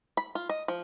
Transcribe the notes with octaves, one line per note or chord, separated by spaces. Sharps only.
B5
F4
D#5
F3